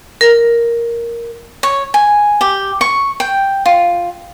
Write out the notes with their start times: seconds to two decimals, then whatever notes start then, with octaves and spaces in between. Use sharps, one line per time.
0.21 A#4
1.63 C#5
1.94 G#5
2.41 G4
2.81 C#6
3.20 G5
3.66 F4